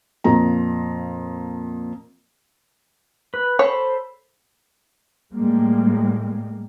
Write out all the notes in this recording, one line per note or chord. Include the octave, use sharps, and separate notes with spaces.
F2 A#2 A#5
B4
A4 C5 C#5 B5
A2 G3 G#3 A#3